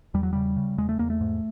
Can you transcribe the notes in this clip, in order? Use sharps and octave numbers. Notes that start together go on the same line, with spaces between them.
E2 G3
F#3
C#3 G3
C#3
E2 G#3
A3
E2 A#3
A3
G#2